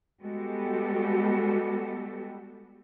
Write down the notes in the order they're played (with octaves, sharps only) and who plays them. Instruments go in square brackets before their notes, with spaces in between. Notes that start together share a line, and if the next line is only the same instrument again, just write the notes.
[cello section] G3 G#3 B3 F#4 G4 A4